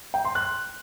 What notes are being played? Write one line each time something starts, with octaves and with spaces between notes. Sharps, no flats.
G5
C6
F#6